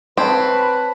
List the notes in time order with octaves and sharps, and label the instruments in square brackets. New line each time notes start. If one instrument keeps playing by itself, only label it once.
[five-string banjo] C4 [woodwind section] B4 B5 [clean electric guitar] C#5 A5